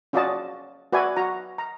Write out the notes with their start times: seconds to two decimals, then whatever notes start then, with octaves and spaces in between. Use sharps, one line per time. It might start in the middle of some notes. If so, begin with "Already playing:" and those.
0.13 C#4 F4 F#4 D5 D#5 A5
0.92 F#4 B4 D5 E5 G#5
1.17 F#4 A#5
1.58 A#5